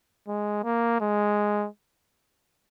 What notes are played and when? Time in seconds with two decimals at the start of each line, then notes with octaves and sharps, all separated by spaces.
0.27 G#3
0.64 A#3
1.01 G#3